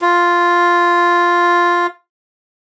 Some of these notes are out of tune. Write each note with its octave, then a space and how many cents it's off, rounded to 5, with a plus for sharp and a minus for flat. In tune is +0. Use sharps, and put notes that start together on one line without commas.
F4 +0